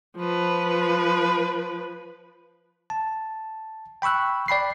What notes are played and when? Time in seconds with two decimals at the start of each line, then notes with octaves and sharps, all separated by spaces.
0.17 F3 B4
2.90 A5
4.02 G5 B5 C#6 E6 F#6
4.48 D5 G5 B5 C7